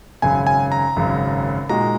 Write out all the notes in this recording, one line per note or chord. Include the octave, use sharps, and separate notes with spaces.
G#1 F#2 C#3 G#5
G#5
A#5
G#1 F#2 C#3
A#2 G#3 D#4 F#4 A#5